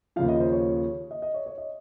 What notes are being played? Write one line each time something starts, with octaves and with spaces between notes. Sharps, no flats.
D#2 C#3 F3 F5
D#5
C5
C#5
D#5
D#5
C#5
C#5
D#5